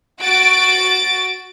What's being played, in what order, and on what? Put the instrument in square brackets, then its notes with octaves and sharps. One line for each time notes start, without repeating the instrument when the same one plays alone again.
[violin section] F#4 A6 D7